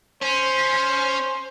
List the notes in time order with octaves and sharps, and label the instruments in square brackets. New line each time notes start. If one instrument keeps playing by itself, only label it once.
[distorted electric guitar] C#4 [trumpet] C5